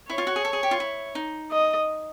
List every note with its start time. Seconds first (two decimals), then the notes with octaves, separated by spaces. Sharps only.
0.09 E4 C#5
0.18 F4
0.27 F#4
0.36 G#4
0.45 A4
0.53 G#4
0.63 G4
0.71 F4
0.80 E4
1.15 D#4
1.51 D#5